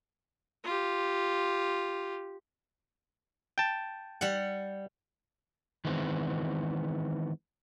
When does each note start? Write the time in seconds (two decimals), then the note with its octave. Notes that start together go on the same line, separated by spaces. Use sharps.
0.64 F4 G4
3.58 G5 A5
4.21 G3 F#5
5.85 D#3 E3 G#3 B3 C4